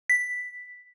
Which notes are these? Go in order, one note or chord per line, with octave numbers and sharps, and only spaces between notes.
B6